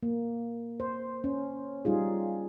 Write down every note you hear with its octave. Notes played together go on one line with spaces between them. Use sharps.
A#3
C5
C#4
G3 D#4 F4 G#4